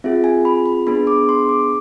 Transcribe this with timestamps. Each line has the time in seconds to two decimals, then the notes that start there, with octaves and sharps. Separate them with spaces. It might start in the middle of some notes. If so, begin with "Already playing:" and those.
0.04 C4 F4 G#4 E5
0.24 G#5
0.45 B5
0.66 B5
0.87 B3 D4 G#4 B5
1.07 D6
1.29 C6
1.49 D6